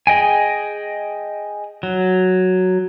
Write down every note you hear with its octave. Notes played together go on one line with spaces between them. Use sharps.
G#4 D#5 G5 G#5
F#3